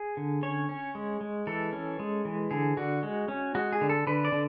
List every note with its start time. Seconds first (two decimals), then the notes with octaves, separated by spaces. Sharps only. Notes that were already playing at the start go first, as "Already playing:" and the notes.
Already playing: G#4
0.17 D3
0.43 C#4 C#5
0.69 C#4
0.95 G#3
1.21 G#3
1.47 E3 A4
1.73 C#4
2.00 G#3
2.25 E3
2.51 D3 G#4
2.77 D3 F#4
3.03 G#3
3.28 C#4
3.55 G#3 F#4
3.73 G#4
3.81 D3
3.90 A4
4.07 D3 B4
4.25 D5
4.32 D3